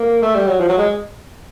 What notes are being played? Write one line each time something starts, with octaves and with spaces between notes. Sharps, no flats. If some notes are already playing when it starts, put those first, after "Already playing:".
Already playing: A#3
A3
G3
F#3
F3
F#3
G#3